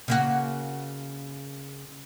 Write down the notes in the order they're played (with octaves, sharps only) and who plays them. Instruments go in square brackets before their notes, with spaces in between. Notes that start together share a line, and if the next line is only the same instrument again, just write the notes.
[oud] C#3 A#3 F#4